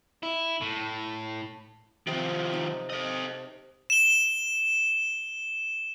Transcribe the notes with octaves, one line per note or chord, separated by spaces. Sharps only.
E4
A2
C3 D#3 F3 C4
D#4
A4 D#5
E7 G7